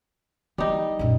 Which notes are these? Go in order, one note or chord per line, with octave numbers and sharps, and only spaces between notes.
E3 G3 D#4
F#2 A#2